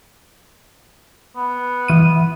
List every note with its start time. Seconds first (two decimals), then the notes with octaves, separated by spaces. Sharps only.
1.36 B3
1.88 E3 D#7